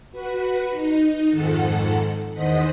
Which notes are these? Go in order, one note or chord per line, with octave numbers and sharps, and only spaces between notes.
F#4 B4
D#4
F2 G#2 D#3 A4 F#5
E2 D#3 C5 D#5 F#5 B6